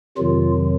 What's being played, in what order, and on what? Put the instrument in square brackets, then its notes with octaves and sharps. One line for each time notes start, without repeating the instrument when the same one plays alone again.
[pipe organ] F2 C3 D#3 F#3 F4